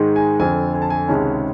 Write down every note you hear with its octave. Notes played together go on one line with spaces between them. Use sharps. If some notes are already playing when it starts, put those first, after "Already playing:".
Already playing: G#2 D#3 G#3
G#5
F2 D3 F3 G#5
G#5
A5
G#5
C#2 C3 D#3 G#3 C#4 A5